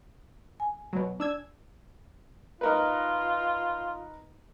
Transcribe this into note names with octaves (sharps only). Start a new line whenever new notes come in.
G#5
B2 F#3
D4 E6 G#6
D#4 F4 A#4 B4